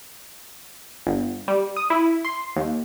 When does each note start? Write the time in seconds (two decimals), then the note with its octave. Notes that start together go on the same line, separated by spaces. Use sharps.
1.07 G1
1.48 G3
1.76 D#6
1.90 E4
2.25 C6
2.56 D#2